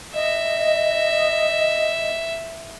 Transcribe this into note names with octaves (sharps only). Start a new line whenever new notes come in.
D#5 E5